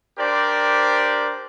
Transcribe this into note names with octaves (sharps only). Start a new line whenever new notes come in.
D4 G4 A#4 C5 D5